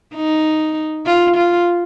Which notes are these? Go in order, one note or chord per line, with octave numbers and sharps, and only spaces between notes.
D#4
F4
F4